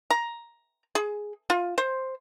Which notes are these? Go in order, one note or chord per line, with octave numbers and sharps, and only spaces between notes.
A#5
G#4
F4
C5